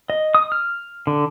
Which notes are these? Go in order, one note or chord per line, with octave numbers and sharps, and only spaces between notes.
D#5
D#6
F6
D3